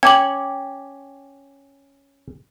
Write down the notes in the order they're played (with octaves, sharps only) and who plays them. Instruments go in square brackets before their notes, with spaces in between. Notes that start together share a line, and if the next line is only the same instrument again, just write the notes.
[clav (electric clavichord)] C#4 [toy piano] G5 D6 [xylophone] G#6 F#7